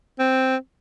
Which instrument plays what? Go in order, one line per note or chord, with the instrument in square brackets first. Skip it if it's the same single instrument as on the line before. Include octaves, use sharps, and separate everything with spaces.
[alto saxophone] C4